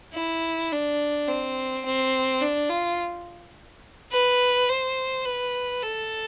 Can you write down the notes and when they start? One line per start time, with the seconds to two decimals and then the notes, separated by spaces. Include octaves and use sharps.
0.14 E4
0.72 D4
1.28 C4
1.85 C4
2.41 D4
2.70 F4
4.12 B4
4.69 C5
5.25 B4
5.83 A4